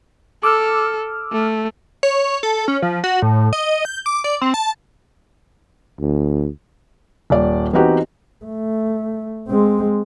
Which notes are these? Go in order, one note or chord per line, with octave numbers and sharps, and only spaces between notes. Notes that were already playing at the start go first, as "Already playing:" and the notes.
A4 D6 E6 F6
A3
C#5
A4
C#4
F3
F#4
A2
D#5
G6
D6
D5
C4
A5
D2
D#1 D5
E3 B3 C4 D#4 F#4 G4
A3
G#3 C4